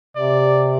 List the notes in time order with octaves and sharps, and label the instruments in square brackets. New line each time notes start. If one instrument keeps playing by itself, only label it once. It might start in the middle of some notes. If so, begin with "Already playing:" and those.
[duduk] C3 [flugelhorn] D5